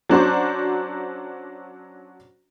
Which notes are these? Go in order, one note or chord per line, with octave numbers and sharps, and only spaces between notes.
F#3 C#4 D4 F#4 C5